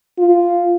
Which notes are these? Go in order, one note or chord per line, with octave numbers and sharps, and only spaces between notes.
F4